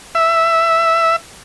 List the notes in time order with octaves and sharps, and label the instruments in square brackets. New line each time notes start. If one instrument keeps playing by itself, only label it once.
[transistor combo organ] E5